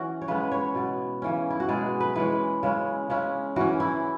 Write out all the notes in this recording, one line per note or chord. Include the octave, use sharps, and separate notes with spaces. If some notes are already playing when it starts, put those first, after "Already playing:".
Already playing: E3 C#4 F#4
C#5
C#3 G#3 B3 B4
C#5
B2 B3
C#3 E3 C#4
E4
F#4
B2 G#3 B3 G#4
B4
E3 G#3 C#4 B4
C#3 G#3 C#4
C#3 G#3 C#4
E3 C#4 F#4
E4